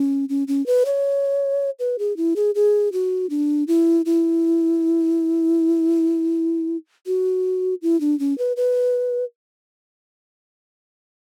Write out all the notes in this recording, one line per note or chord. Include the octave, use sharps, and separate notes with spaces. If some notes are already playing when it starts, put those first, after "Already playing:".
Already playing: C#4
C#4
C#4
B4
C#5
B4
G#4
E4
G#4
G#4
F#4
D4
E4
E4
F#4
E4
D4
C#4
B4
B4